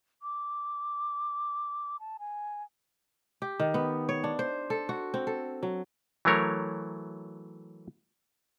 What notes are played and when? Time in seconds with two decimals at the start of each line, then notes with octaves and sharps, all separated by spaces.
0.22 D6
2.00 A5
2.19 G#5
3.42 G4
3.60 D#3
3.74 B3
4.09 C#5
4.24 D4
4.39 C5
4.70 A4
4.89 F#4
5.14 C4
5.27 A4
5.63 F#3
6.25 E3 F#3 A3 A#4 C#5